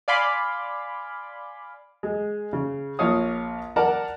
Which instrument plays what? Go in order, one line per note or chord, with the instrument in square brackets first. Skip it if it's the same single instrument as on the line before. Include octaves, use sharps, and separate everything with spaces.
[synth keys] D5 F5 G#5 B5 C6 D6
[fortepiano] G#3
C#3
A#1 F4 C#5 F5 D#6
A#4 D5 F#5 A5 A#5